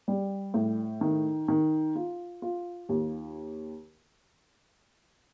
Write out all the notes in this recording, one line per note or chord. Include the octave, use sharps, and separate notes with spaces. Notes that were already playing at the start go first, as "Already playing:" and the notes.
G3
A2
D#3
D#3
F4
F4
D#2